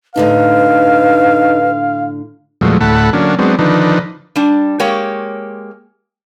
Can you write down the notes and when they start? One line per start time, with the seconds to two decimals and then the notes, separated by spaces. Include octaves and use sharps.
0.16 A2 D3 D4 D#4 B4 F5
2.61 E2 A#2 F3 F#3 G#3 A3
2.81 D2 A2 A3 F#5 A5 B5
3.13 D3 F#3 A#3 C#4 D4
3.39 F#3 G#3 B3 C4 D4
3.59 D3 D#3 F3 D4 D#4 B4
4.36 G3 D4
4.80 G#3 A#3 G4 C#5